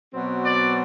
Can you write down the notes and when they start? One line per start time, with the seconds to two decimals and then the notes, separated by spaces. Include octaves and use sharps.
0.12 B2 F#3 C4
0.45 D5